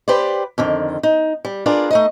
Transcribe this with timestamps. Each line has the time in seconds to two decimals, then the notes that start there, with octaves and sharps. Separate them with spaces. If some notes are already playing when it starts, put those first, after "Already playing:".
0.08 G4 B4 C5 D5
0.58 F2 D3 D#3
1.03 D#4
1.45 G3
1.66 D4 F4 G#4 A#4 B4 D5
1.91 A3 D#4 D#5